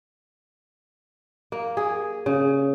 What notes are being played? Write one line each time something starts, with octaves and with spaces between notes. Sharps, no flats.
A#3
G#4
C#3